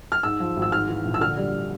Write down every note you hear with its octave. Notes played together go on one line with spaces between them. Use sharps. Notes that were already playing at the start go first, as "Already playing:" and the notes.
F6
G#2 E6
F3
G#1
E6
G#2 F6
E3
A#1
E6
D3 F6
G3